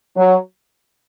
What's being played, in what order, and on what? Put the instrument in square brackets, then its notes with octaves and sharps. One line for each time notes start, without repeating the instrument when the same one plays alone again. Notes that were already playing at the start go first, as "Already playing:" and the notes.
[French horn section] F#3